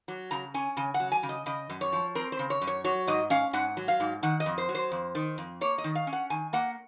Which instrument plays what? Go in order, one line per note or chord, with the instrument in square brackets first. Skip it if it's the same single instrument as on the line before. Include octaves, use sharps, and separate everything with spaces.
[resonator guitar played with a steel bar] F#3
C#3 A#5
C#4 G#5
C#3 G#5
F#5
F#3
G#5
C#3
D#5
C#3 D#5
F#2
C#5
F3
C4 A#4
C5
C#3
C#5
F#2
C#5
F#3 C#5
G#2 D#5
C#4 F5
G#2 F#5
F#3
F5
G#2
D#3 F#5
D#5
F2
C5
F#3
C5
F2
D#3
F2
A#3 C#5
D#5
D#3
F5
C#4
F#5
D#3 G#5
A#3 F#5